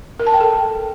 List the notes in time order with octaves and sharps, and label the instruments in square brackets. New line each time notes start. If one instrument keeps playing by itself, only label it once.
[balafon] A#4
A5
G5
A4